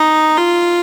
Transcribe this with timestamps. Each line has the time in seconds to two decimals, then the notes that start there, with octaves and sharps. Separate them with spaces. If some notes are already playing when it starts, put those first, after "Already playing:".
Already playing: D#4
0.37 F4